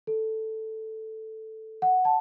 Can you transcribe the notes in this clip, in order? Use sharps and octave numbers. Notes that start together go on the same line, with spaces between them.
A4
F#5
A5